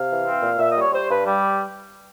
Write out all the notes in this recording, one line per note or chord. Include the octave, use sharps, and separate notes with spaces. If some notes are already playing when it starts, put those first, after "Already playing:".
Already playing: C3 F5
E3
C4
A#2
A#2 E5
D#5
G3 C#5
G3 C5
G2 B4
G3